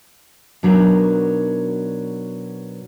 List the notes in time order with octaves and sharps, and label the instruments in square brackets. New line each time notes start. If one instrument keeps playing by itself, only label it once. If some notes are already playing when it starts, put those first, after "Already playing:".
[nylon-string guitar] B2 F#3 D4 D#4 A#4